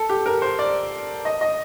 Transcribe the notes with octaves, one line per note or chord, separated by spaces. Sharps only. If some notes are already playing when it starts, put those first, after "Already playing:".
Already playing: A4
G4
A#4
C5
D5
D#5
D#5